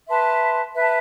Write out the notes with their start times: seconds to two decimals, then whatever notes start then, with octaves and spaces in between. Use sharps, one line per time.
0.07 B4 E5 A5 C6
0.75 B4 E5 A5